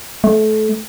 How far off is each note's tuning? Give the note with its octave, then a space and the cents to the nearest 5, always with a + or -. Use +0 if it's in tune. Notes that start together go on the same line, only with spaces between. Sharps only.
A3 -25